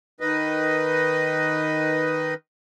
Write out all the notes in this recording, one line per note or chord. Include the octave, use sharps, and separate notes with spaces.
D#3 B4 D#5